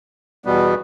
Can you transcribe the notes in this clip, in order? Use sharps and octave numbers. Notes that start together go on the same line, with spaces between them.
E2 B2 G3 B3